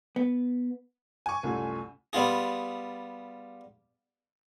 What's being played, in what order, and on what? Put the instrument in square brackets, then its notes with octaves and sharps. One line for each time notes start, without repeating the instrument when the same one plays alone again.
[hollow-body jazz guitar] B3
[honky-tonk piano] G#5 C#6
[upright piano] C2 F#2 [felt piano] A3 F4 A4
[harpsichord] G3 B3 F4 G#4